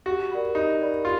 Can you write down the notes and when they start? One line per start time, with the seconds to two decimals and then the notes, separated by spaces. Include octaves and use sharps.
0.06 F#4 G4
0.31 A#4 D5 F#5 B5
0.55 D#4 G4
0.80 A#4 D5 F#5 B5
1.04 F4 G4